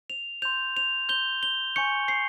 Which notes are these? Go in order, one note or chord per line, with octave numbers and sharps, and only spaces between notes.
F7
C6 G6 F7
F7
C6 G6 G7
G7
G#5 C#6 G6 C#7
C7